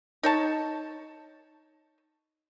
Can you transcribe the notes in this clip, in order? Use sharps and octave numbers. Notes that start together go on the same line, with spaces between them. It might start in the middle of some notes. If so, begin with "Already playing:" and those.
D#4 C#5 A5